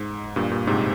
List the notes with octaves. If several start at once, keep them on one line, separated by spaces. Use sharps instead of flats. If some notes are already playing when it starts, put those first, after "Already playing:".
Already playing: G#2
G2 A#2
G2 A#2
G#2 C3